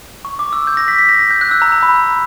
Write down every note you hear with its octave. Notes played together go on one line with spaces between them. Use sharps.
C#6
D6
E6
G6
A#6
B6
B6
A#6
A#6
G6
F#6
E6
A#5
A#5
B5